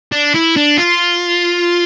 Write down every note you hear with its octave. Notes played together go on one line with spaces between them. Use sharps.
D4
E4
D4
F4